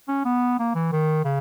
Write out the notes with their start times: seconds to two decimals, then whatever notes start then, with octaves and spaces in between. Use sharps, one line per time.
0.08 C#4
0.25 B3
0.59 A#3
0.75 E3
0.92 D#3
1.25 C#3